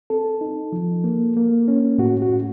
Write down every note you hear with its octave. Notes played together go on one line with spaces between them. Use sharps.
C4 A4
D#4
F3
A#3
A#3
C#4
A2 F#4
F#4
A2